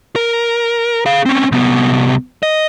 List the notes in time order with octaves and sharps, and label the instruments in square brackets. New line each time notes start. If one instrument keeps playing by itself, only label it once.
[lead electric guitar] A#4
G#4 F5
C4 C#4
C2 B3
D#5